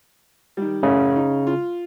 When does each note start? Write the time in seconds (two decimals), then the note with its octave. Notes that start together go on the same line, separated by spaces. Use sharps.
0.57 D#3 G3
0.83 A1 F#2 C#3
1.16 D#4
1.47 F4